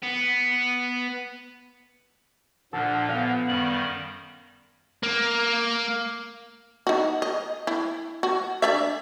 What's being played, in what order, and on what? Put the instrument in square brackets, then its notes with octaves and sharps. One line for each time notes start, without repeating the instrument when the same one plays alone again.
[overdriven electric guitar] B3
[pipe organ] A#2 F3 [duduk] D4 [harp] A4 F6 [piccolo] F#5
[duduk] B3 [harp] F5
[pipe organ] F#2 D#3 G3 [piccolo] F#7
[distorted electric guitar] A#3
[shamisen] D#4 F#4
D#5
E4
F#4
D4 D5 E5